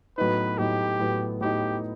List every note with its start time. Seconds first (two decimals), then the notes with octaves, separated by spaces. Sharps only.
0.18 A2 F#3 B3 D#4 B4
0.58 A2 F#3 B3 D#4 G4
0.99 A2 F#3 B3 D#4
1.41 A2 F#3 B3 D#4 G4